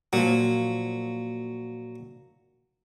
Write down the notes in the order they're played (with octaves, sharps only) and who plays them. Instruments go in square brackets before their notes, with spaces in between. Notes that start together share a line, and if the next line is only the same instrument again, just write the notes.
[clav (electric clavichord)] A#2 F3 [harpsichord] F#3